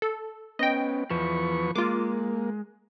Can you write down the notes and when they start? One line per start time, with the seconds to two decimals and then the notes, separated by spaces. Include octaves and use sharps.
0.02 A4
0.59 B3 C#4 D#5 G5
1.10 E2 F3 B4 C#6
1.76 G#3 A#3 F4 D6